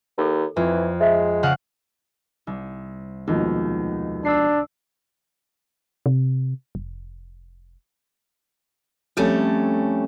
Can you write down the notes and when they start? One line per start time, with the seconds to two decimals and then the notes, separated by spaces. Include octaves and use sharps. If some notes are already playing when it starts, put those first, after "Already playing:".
0.18 D#2 E4 A4
0.56 F2 E3
1.00 G#3 C5 E5
1.43 C#3 F5 F#5
2.47 C2
3.27 D#2 B2 F3 G#3
4.25 D4 E6 C7
6.06 C3
6.75 F1
9.17 F2 G3 A3 C#4